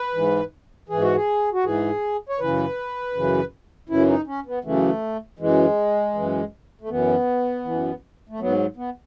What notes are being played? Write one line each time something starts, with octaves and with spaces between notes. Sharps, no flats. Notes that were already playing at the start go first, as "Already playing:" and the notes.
Already playing: B4
G#2 E3
G#2 E3 G#4
F#4
G#4
F#4
G#2 E3 G#4
C#5
F#2 C#3 E3 B4
F#2 C#3 E3
F#2 C#3 E3 E4
D#4
C#4
B3
F#2 C#3 E3 A3
F#2 E3 G#3
F#2 E3
A3
F#2 E3 B3
F#2 E3
A3
G#2 F#3 B3
B3